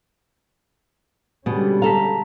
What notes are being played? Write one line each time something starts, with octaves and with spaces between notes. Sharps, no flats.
B2 D3 G3 G#3 C#4
A4 F5 A#5 B6